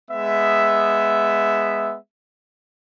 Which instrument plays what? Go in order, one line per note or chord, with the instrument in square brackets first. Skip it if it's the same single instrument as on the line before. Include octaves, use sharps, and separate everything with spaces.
[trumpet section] G#3 B3 E5